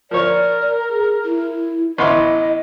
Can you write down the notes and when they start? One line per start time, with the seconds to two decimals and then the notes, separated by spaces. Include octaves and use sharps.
0.11 F3 A#4 C#5 D5
0.89 G#4
1.25 E4
1.98 A1 B3 E4 D#5 C6